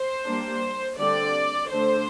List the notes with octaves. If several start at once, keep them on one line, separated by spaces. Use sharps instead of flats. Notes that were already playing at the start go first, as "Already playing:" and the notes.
Already playing: C5
G3 A#3 D4
D3 G3 C4 D5
D3 A3 D4 C5